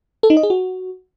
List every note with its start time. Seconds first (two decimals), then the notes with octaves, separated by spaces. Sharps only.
0.23 A4
0.30 D#4
0.37 D#5
0.43 G#4
0.50 F#4